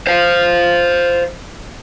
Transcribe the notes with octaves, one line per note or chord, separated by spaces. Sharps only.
C5 F5